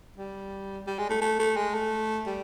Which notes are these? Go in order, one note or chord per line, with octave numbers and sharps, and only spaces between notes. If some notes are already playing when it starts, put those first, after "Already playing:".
G3
G3
G#3
A3
A3
A3
G#3
A3
G3